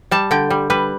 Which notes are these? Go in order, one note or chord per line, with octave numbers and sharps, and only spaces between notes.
G3 A5
D3 G5
G3
G3 B4